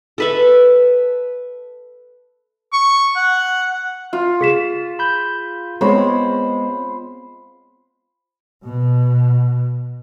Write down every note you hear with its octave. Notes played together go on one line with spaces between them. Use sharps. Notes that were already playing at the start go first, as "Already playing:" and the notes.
A4 B4 E5
C#6
F#5
F4
G#4 B6 E7
B5 G6
G#3 B3 C4 C5 C#5 B5
B2